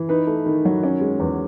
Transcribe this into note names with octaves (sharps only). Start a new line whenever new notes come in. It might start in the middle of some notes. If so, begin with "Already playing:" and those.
Already playing: E3
D#4 B4
A3
D#3
F#3
C#4
G#3
E2